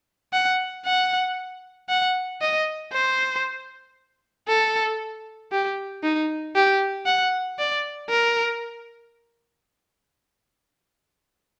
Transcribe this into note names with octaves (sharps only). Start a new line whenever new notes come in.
F#5
F#5
F#5
D#5
C5
A4
G4
D#4
G4
F#5
D5
A#4